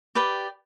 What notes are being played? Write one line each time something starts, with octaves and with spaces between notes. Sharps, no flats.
G4 B4 D5 G5